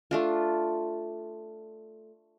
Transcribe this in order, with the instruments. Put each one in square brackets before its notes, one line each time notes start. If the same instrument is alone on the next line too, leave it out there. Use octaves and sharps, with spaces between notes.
[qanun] A3 D4 F4